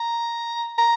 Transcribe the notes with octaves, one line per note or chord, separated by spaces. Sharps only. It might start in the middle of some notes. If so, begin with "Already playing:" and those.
Already playing: A#5
A#5